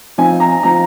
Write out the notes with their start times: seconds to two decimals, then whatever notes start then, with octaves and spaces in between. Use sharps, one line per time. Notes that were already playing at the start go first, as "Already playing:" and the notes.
0.18 F3 C4 D#4 G#5
0.40 A#5
0.63 F3 C4 D#4 A#5